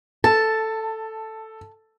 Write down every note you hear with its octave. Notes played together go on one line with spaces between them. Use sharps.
A4 A5